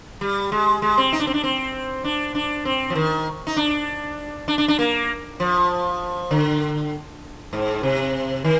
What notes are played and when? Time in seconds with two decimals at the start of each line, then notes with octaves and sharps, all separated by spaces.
0.21 G3
0.52 G#3
0.82 G#3
0.98 C4
1.13 D#4
1.20 D4
1.27 C4
1.34 D4
1.43 C4
2.04 D4
2.35 D4
2.65 C4
2.90 F3
2.96 D#3
3.47 D#4
3.57 D4
4.48 D4
4.58 D4
4.68 D4
4.79 A#3
5.40 F3
6.31 D3
7.53 G#2
7.83 C3
8.44 D#3